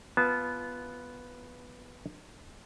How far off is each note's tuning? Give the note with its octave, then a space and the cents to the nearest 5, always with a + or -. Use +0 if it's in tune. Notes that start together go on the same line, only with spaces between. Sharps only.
B3 +0 F4 -10 A5 -30